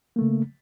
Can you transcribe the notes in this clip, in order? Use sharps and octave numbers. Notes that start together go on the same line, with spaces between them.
C#3 A3 A#3